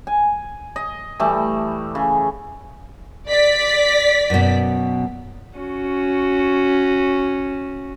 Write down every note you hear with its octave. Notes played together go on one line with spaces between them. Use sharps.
G#5
D#5
E3 G3 A3 A5
C#3
D5 B6
F#2 B2
C#4 F#4